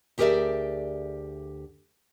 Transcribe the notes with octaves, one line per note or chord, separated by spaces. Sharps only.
D2 G4 G#4 A#4 D5 E5